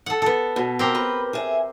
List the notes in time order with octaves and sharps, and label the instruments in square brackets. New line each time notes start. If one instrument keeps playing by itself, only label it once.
[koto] A4 F#5
B3 A4
[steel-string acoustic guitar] B2
[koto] C4 G4 A#4
[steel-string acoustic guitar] B4
G#4 E5